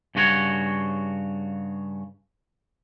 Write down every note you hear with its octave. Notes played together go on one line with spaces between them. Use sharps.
G2 C#3 F#4 B4 C#5